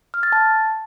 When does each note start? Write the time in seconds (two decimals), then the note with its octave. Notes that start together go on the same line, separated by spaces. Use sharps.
0.14 F6
0.23 A6
0.32 A5